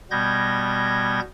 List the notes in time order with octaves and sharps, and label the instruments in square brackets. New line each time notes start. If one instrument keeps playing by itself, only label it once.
[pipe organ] B2 G3 B3 G6 G#6 A#6